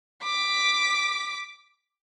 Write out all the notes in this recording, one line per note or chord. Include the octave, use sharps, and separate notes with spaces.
D6 B6